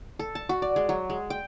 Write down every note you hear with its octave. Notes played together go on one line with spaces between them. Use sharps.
A4
A5
F#4
D5
G#3
F#3
G#3
G5